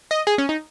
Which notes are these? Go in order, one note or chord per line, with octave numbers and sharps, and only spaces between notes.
D#5
G#4
C#4
D#4